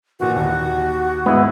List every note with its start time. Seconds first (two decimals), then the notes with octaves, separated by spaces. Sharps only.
0.20 A#2 E3 F#4
0.36 D#2 F#4
1.26 G#2 B3 E4